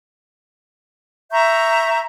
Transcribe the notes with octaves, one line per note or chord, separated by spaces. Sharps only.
E5 A#5 C#6 G6